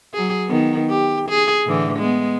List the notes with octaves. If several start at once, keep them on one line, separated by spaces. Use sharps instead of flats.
F#3 G#4
D#3 B3
G4
G#4
A2 D3 E3
G#3 B3